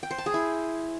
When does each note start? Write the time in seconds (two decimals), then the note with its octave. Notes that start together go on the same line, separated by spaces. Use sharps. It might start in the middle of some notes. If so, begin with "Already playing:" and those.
0.03 G5
0.11 C5
0.18 A5
0.26 G#4
0.34 E4